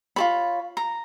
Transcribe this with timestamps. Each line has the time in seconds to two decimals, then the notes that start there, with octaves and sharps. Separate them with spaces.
0.16 F4 A4 C#5 B5
0.77 A#5